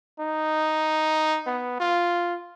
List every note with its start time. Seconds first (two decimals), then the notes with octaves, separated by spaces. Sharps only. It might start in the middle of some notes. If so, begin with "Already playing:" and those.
0.20 D#4
1.47 B3
1.80 F4